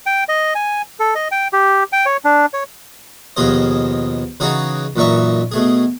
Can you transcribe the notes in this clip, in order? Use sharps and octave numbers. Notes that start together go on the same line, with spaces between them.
G5
D#5
G#5
A4
D#5
G5
G4
G5
C#5
D4
C#5
D#2 B2 F3 G#4 C5 D#5
C#3 E3 D#4 F#4 G#4 C#5
F#2 A#2 E3 D#4 E5 C#6
B2 A3 G#4